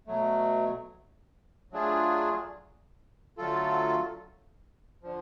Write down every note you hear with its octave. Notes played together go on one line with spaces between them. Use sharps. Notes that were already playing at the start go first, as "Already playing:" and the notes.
B2 F#3 A3
F#3 A3 D4 F4 G#4
D3 F#3 A3 F4 A4
D3 F3